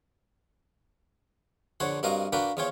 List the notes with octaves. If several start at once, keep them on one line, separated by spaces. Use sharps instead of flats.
A#1 D3 C5 C#5 F#5
G2 C4 F#4 A#4 D#5 F5
A#3 D4 F#4 A#4 B4 G5
E2 F3 F4 C#5 G5